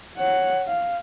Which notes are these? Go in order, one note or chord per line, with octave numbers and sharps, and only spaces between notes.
C#5 F#5
F5